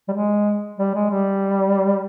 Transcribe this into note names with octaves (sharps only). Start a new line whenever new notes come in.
G3
G#3
G3
G#3
G3